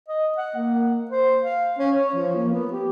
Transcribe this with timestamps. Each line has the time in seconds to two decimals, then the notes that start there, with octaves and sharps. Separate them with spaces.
0.09 D#5
0.37 F#5
0.56 A#3
1.11 C5
1.43 F5
1.79 C#4
1.96 C#5
2.14 F3
2.35 A#3
2.51 B3
2.73 G4